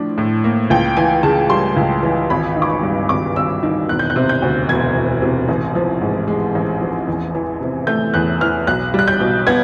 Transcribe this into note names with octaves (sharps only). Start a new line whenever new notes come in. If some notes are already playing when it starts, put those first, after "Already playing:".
Already playing: A2 F3 D4
A2
A#3
C#2 G5
E3 G#5
C#3 A5
G3 C6
C#2
E3
G#1 B5
D#3
D6
C#6
G2
G#1 D6
G#1 E6
D#3
E1 F#6
G6
F#6
C3
G6
D2
E1 G#6
E1
C3
A1
F3
G#2
G#3
A1
F3
E2
E3
C3
A3 G6
E2 F#6
E3 F6
B1 F#6
G3 F#6
G6
B2
B3 G#6